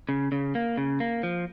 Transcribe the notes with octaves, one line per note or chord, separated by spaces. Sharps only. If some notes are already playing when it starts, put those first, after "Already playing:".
C#3
C#3
A#3
C#3
A#3
F3